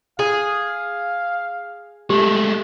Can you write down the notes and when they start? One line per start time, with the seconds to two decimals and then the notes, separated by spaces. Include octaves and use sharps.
0.19 G#4 F5
2.10 G#3 A3 G4 A4